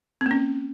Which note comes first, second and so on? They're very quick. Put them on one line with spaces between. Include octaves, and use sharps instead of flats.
C4 A#3 C#4